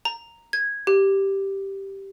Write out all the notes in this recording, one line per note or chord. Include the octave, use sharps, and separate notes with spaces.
A#5
G#6
G4